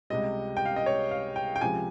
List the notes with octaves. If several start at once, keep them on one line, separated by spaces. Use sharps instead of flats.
C#2 C3 G3 D#5
G5
F5
D#5
C#5
F5
G5
G5
C#2 C3 F3 G#5